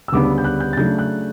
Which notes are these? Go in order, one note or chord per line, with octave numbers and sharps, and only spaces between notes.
E6
D2 C#3 G3 B3 D4 D6
G6
F#6
G6
A6
C#3 F#3 A3 D4 G6
F#6